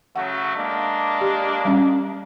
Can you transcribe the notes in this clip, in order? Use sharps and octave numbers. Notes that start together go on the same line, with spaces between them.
C#3 F#3 A3 F#5
G#3 A#3 D4
G4
G3 C#4